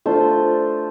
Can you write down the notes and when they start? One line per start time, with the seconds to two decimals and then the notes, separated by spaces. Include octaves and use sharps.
0.06 A3 D4 F4 C5